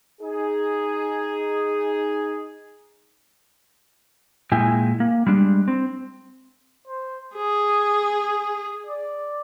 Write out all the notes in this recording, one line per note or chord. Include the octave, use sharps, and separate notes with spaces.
D#4 G#4
A#2 G#3 E4 G5 G#5
A#3
G3 G#3 D4
C4
C5
G#4 G#5
D5